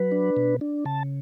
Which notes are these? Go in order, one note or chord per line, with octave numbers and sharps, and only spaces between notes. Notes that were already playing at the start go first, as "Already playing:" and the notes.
Already playing: F#3 B4
D4
B2
D4
C#3 A5